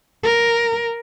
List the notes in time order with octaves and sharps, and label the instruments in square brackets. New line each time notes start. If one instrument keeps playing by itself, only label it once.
[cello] A#4